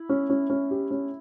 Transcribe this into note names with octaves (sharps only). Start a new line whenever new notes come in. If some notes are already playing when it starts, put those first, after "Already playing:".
Already playing: E4
C#4
C#4
C#4
G4
C#4